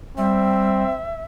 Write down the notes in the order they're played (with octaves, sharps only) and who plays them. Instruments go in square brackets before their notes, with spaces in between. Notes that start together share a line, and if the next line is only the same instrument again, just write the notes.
[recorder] G3 [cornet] C4 [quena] E5